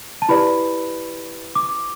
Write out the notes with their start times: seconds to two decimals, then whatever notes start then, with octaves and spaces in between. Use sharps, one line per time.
0.22 A5
0.29 E4 G4 B4 D5 B5
1.55 D6